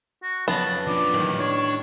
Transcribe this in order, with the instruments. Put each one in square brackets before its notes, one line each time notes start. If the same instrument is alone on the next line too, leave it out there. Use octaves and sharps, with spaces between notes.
[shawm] F#4
[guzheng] F2 C#3 F#3 [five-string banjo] B3 [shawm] A5
[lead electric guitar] F3 D4 [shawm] D5
[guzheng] A2 D#3 G3 [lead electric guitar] E3 F#3
[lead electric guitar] D4 [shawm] C#5